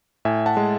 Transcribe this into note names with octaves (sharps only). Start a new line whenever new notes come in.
A2 E5 G#5
F#5 A5
G#3